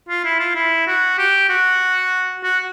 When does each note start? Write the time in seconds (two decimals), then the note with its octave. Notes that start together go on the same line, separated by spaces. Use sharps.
0.09 F4
0.25 E4
0.39 F4
0.55 E4
0.87 F#4
1.18 G4
1.49 F#4
2.43 F#4